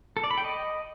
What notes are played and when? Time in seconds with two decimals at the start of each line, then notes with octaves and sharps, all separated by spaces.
0.17 A4
0.24 D5
0.31 B5
0.38 G5
0.45 D#5